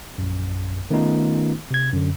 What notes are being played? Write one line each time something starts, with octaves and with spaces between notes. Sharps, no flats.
A#1 F#2
D#3 A3 B3 C#4 D#4 F4
C3 G#6
F#2 D3